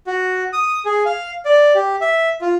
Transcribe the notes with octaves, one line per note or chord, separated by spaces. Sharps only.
F#4
D#6
G#4
F5
D5
G4
E5
F4